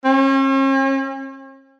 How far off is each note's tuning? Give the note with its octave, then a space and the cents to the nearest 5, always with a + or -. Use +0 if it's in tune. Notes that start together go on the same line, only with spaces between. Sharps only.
C#4 -45